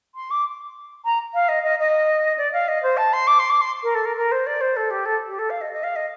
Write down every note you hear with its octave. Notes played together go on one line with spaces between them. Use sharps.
C6
D6
A#5
F5
D#5
D#5
D#5
D5
F5
D#5
C5
A5
C6
D6
C6
D6
C6
A#4
A4
A#4
A#4
C5
D5
C5
A4
G4
A4
G4
A4
F5
D#5
D#5
F5
D#5